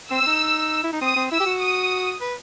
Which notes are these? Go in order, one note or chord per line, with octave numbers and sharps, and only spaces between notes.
C4 E6
C4
D#4
E4
D#4
C4 D#6
C4
E4 E6
G4
F#4
D#6
B4